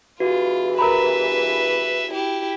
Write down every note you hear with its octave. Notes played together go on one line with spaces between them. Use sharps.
E2 G2 E3 F4 F#4
A#4 B4 E5 A#5 B5
E4 G4